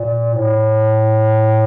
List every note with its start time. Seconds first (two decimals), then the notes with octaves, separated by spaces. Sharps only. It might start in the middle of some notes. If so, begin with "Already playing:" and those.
Already playing: A#2
0.34 A2